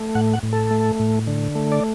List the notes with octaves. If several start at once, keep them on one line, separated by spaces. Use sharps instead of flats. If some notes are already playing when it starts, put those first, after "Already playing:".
Already playing: A3
A2 F#5
F#5
A2
A4
A3
A2
D3
A3
D5